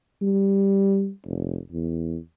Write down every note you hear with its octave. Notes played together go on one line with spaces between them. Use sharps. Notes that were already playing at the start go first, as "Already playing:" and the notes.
G3
F1
E2